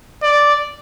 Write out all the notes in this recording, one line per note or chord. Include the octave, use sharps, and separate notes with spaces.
D5